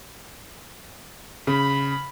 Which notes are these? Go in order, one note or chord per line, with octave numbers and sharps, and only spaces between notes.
C#3 B5